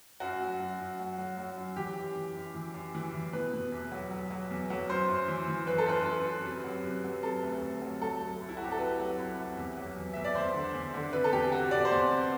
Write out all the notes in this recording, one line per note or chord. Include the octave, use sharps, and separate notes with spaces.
F#2 F#4
F#3
F#2
F#2
F#3
F#3
F#3
F#2
E3 G4
F#2
E3
F#2
E3
F#2
E3
E3
B2 B4
B2
E2
F#3
F#3
F#3
E2
F#3
F#2 C5
F#2
E3
E3
F#2 B4
A4
F#2 B4
F#2
F#2
C3
F#3
C3
F#3
C3 A4
D2
D2
F#3
F#3 A4
C2
C2
E4
F#4
C2 G4
A4
C3 B4
F#3
C2
C2
E2
F#3
E2
E2 E5
D5
E2 C5
D3
E2
D3
C3 B4
A4
E2 G4
C3 F#4
C3 D5
C5
E2 D5
C3